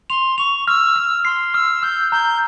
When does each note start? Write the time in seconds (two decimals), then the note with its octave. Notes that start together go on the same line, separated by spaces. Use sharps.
0.10 C6 F7
0.38 C#6 F7
0.67 E6 F6
0.96 F6
1.25 C6 C7
1.54 E6 F6
1.83 E6 G6
2.12 A#5 G6